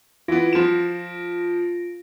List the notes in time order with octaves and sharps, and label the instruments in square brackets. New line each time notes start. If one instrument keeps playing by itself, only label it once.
[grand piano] E3 B3 [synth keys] F4 A#6 D7
[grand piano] F3 E7